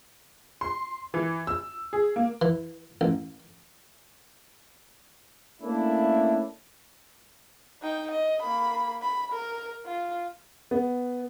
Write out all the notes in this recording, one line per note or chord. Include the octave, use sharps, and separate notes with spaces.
C6
E3
E6
G#4
A#3
E3
A1
A3 A#3 C#4 D4 E4
D#4 G5
D#5
A#3 B5
B5
A#4
F4
B3